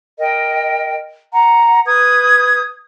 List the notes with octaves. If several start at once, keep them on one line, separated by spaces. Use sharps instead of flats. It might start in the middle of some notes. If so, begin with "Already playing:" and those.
A#4 D#5 G5
F#5 A#5
B4 D#6 G#6